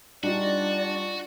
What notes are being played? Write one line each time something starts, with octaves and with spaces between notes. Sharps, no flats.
G3 D4 D#4 F4 F#4 D5